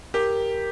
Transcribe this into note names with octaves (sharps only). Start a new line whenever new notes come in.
G4 A#4